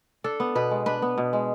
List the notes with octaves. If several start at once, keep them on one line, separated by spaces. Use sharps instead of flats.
D4 A4
B3
B2 B4
G#3
D4 B4
B3
B2
G#3